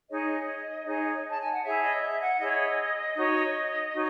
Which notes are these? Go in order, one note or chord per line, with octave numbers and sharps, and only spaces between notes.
D#4 G#4 C#5 D#5
D#4 G#4 C#5
A5
G#5
F#5
E4 G#4 C#5 E5
D#5
E5
F#5
E4 G#4 C#5 D#5
D#4 F#4 C#5
D#4 F#4 C#5